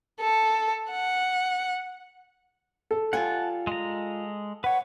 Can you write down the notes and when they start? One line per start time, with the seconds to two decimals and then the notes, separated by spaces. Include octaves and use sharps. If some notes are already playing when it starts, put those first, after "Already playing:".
0.20 A4
0.91 F#5
2.91 A4
3.13 G3 F4 F#5 G#5 A5
3.67 G#3 A#5
4.64 B4 C#5 F#5